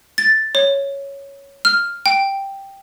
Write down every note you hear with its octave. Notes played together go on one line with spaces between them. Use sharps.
A6
C#5
F6
G5